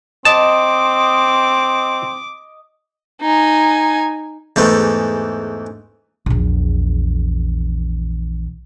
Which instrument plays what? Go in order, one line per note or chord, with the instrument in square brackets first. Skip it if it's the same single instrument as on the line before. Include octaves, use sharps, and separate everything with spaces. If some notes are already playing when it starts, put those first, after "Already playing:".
[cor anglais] C4 [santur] D#5 [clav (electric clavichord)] A5 [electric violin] D6
[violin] D#4 G#5
[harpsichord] E2 G#2 E3 A3
[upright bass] A#1 E2